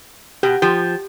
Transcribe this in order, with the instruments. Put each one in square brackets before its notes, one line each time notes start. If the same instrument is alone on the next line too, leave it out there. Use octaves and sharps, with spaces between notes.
[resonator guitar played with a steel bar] B2 [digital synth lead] G4
[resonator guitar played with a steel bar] F3 [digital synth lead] G4